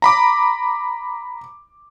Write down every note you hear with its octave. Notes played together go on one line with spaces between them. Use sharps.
A#5 B5 D6